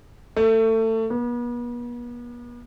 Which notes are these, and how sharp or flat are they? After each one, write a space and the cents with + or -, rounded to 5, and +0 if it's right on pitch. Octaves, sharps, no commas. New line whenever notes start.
A3 +25
B3 -40